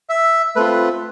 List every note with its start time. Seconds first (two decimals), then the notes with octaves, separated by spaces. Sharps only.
0.09 E5
0.56 A3 C4 F4 B4